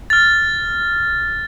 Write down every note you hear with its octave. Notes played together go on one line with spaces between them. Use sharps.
F6 A6